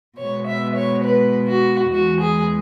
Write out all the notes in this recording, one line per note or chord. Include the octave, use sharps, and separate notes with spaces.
B2 G#3 B3 C#5
E5
C#5
B4
F#4
E2 E3 G#3 F#4
G#4